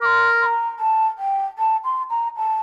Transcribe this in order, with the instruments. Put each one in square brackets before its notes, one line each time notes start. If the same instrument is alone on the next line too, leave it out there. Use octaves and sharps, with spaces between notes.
[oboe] A#4 [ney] C6 D6
[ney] C6
A#5
A5
G5
A5
C6
A#5
A5